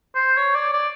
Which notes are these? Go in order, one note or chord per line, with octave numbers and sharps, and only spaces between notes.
C5
C#5
D5
D5